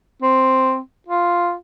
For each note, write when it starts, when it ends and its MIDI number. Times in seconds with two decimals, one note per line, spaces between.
0.22 0.78 60
1.08 1.53 65